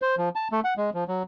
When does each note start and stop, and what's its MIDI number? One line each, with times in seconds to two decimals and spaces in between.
0.02 0.15 72
0.18 0.29 53
0.36 0.48 81
0.52 0.60 57
0.64 0.74 78
0.77 0.90 56
0.94 1.04 53
1.08 1.23 54